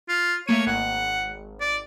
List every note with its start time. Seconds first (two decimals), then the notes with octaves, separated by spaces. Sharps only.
0.09 F4
0.47 A3 A#3 C#5 D#7
0.67 G#1 F#5
1.60 D5